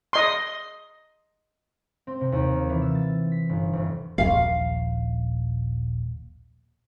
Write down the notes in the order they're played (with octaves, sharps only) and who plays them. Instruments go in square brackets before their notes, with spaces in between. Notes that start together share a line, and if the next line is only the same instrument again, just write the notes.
[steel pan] D#5 C6
[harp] C4
C3
D#2
A#3
E3
E6
A6
B6
G1
F1
[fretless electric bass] D#1 A#1 [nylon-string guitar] F5